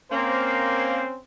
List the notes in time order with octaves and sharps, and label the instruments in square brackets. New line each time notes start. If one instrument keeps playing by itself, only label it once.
[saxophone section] A#3 [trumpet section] C4 C#4 C5